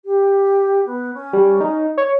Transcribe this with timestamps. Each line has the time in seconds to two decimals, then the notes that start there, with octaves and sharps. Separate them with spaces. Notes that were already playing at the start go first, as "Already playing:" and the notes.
0.05 G4
0.85 B3
1.14 C#4
1.33 G3
1.61 D#4
1.97 C#5